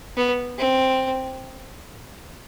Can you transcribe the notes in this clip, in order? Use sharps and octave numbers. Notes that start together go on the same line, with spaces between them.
B3
C4